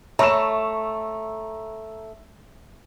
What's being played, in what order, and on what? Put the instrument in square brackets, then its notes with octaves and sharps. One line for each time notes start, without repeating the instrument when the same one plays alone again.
[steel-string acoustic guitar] A3 [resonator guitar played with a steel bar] C#5 [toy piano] E5 B5 [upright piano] A#5 E6 E7